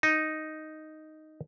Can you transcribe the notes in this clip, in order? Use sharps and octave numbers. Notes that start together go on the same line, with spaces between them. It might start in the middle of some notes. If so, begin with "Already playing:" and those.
D#4